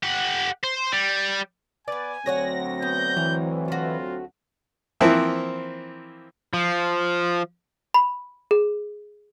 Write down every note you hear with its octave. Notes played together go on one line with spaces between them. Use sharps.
G4 F#5
C5
G3
B3 B4 D5 G#5
D2 F#3 C4 F#4 C#5 F#5 A#6
B3 G6
E3 A#5
A3 F4 F#4
E3 F3 A#3 C4 E4
F3
B5
G#4